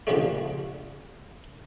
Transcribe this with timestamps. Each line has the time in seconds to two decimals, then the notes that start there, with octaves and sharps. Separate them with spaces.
0.07 C#2 A#2 D3 F3 G3 A3